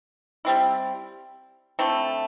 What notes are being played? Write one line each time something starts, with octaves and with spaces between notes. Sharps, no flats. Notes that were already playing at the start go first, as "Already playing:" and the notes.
G3 C4 E4
D3 A3 C4 E4